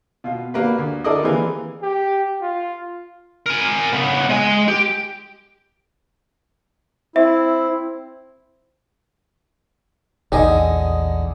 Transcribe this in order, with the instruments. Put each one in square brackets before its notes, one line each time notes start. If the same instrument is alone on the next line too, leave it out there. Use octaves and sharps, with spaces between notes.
[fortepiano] B2 F4
G3 A#3 F#4 B4
D2
D4 E4 A4 A#4 D5 D#5
E3 G3 G#3 A#3 C4
[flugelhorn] G4
F4
[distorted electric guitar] A#4 G#5
C#3 B3
G#3 G#5
G4
[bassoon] C4 [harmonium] E4 [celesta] E5
[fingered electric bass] A#1 E2 [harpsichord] D3 G#4 [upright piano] D#4 D#5